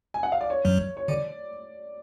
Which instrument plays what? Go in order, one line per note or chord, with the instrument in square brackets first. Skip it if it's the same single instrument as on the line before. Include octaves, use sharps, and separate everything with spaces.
[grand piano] G#5
F#5
F5
D5
C#5
[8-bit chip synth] F#2 F#3
[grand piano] C#5
[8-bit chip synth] D3 [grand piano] D5